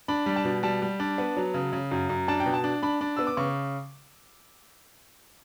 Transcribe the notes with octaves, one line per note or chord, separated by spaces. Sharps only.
D4 B5
G3
A5
B2
G3 A5
G3
D4
B3
F#3
C#3
C#3
F#2
F#2
D4 A5
G5
B2
A5
D4
D4 B5
D4
B3 E6
D6
C#3 C#6